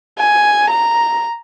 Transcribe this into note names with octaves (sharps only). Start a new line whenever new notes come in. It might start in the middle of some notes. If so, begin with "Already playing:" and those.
G#5
A#5